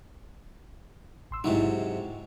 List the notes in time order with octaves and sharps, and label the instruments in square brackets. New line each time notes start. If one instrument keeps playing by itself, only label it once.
[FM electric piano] A1 C6 E6
[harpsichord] G#2 C3 F#3 [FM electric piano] D#4 E4